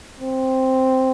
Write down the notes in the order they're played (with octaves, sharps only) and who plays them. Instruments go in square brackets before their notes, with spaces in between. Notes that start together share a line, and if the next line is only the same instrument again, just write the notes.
[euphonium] C4